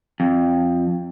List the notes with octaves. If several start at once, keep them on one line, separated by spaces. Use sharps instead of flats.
F2